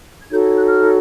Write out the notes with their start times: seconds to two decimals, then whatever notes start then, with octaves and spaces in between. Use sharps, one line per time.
0.21 G#6
0.31 D#4 F#4 A4 C#5 G6
0.44 G#6
0.57 F#6
0.68 F6